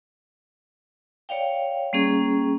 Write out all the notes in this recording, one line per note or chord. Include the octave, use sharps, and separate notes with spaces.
C#5 D5 F5 G5
G3 A#3 C#4 G#4